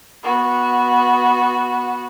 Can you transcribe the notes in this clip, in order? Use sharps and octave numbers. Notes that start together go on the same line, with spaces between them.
B3 F#4